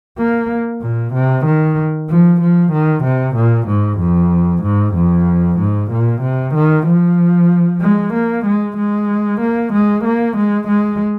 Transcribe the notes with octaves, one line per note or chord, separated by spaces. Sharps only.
A#3
A#2
C3
D#3
F3
F3
D#3
C3
A#2
G#2
F2
G#2
F2
G#2
A#2
C3
D#3
F3
G#3
A#3
G#3
G#3
A#3
G#3
A#3
G#3
G#3